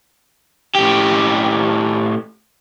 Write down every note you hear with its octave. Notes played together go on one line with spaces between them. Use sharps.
A2 G4